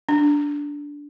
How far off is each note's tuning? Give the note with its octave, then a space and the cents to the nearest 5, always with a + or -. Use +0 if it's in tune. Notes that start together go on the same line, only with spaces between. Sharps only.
D4 -15